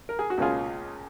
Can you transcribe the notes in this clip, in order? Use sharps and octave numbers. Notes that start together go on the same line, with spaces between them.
A#4
G#4
F#4
C#2 B2 A#3 C#4 F4 G#4